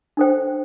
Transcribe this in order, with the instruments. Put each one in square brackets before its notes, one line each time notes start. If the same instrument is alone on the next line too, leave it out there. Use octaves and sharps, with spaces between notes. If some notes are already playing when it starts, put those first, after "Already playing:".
[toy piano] D4 A4 C5 G5